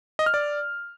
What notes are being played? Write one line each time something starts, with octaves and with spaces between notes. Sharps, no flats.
D#5
F6
D5